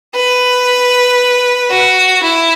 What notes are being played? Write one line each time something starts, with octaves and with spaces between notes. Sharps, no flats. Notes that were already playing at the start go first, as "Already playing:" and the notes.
B4
F#4
E4